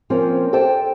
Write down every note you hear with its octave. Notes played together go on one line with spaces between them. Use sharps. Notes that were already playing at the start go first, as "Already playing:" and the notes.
F3 A#3 C4 C#4
A4 C5 D5 G5 A5